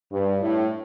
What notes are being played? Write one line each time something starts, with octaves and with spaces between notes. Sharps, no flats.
G2
A2